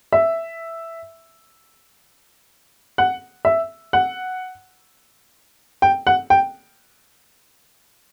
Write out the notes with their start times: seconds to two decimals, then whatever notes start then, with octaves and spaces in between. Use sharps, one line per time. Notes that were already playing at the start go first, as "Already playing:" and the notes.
0.13 E5
2.98 F#5
3.45 E5
3.93 F#5
5.82 G5
6.07 F#5
6.30 G5